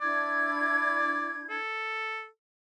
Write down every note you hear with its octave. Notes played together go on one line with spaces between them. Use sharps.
D4 E4 D5 G#6
A4